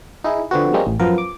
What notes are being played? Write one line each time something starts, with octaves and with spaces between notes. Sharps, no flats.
D#4 E4 G#4
D3 F3 B3 C4 F#4
G3 G#3 A#3 C4 C#4 D#4
A1
F#2 F3 B3 A#4
D6